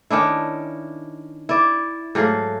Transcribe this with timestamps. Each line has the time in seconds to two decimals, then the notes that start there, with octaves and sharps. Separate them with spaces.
0.10 D#3 C#4 D4 E4
1.49 E4 D5
2.15 G#2 F#3 A3 F5